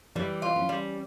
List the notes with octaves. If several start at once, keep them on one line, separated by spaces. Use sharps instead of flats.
E3 G3
F4
C#4
G3